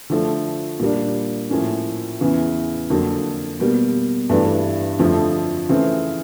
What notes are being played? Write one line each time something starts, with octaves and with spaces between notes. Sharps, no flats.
D3 F3 A3
A#2 G3 A#3 D4
A2 F3 A#3 C#4
E2 C#3 E3
F2 D3 F#3 A#3
B2 G3 A#3
G2 E3 A3 D4 F#4
F2 D3 F3 A3
C#3 E3 A3 C4